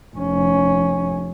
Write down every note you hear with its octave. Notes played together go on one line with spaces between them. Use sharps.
F1 C#4